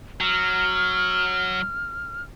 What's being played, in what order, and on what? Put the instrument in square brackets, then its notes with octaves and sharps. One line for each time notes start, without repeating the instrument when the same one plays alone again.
[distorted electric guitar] F#3 [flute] F6